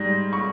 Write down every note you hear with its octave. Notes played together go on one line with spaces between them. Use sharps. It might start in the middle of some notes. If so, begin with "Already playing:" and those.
Already playing: G#2 G3 A#6
C#6